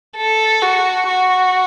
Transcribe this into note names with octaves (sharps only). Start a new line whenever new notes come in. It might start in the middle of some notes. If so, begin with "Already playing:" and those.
A4
F#4
F#4